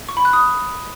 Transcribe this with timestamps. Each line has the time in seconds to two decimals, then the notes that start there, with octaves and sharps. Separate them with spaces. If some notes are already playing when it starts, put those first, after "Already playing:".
0.09 C#6
0.17 B5
0.25 F#6
0.33 D#6